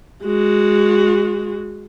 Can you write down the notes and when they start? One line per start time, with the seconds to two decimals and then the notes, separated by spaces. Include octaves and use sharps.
0.24 G#3 F#4